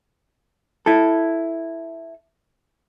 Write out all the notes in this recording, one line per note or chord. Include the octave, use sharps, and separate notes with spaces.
E4 A4